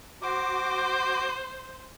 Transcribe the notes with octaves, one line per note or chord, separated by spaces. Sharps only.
F#4 C5 D6